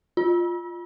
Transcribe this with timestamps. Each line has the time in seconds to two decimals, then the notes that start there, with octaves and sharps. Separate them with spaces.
0.17 F4